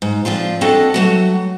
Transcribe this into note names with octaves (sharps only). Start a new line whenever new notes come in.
G#2
F3 C4 D4 F4
C4 D4 F#4 A4 D#5 A5
F#3 A3 F#4